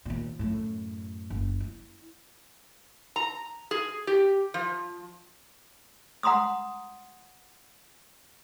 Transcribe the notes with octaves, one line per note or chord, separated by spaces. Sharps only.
D#2 A#2
F#2 A2
F#1
E4
A#5
G#4
G4
F3
F#5 A#5 C6 D#6 E6